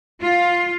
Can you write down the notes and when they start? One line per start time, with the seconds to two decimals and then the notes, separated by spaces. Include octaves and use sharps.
0.21 F4